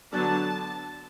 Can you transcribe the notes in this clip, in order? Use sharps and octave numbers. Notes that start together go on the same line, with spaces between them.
D3 F#3 B3 D4 A5